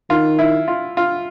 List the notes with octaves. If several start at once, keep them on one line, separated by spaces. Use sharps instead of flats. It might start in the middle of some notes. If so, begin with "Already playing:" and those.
D#3 F4
E4
F4
F4